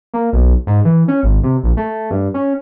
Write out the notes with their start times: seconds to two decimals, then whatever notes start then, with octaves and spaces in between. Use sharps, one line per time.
0.14 A#3
0.33 B1
0.67 G#2
0.85 E3
1.08 C#4
1.23 G#1
1.43 C3
1.64 A#1
1.77 A3
2.11 G2
2.34 C#4